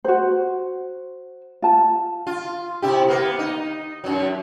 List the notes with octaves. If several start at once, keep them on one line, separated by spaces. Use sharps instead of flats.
F#4 C5
F4 A5
F4
C3 E4 G4
A#3 B3
D#4
F#2 F#3